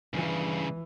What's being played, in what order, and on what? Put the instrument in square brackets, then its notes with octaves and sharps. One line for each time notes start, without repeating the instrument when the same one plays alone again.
[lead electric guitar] G2 C#3 [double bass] E3